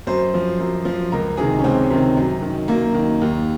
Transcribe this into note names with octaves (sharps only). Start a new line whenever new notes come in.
F#2 C5
F3
F#2
F3
C#2 A#4
C3 D#3 G#4
C#4
C#2 C4
C3 D#3
F#2
D#3
F#2 A#3
D#3
D#2